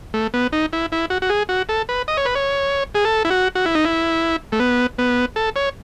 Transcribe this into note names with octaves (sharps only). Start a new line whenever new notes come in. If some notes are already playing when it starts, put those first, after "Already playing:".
A3
B3
D#4
E4
E4
F#4
F#4
G#4
F#4
A4
B4
D#5
C#5
B4
C#5
G#4
A4
E4
F#4
F#4
E4
D#4
E4
A3
B3
B3
A4
C#5